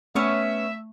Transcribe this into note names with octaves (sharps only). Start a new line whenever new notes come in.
A3 B3 C#4 C#5 E5